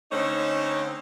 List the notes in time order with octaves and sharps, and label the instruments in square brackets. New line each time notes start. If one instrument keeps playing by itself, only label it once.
[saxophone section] D3 A3 C4 C#4 D#4 C#5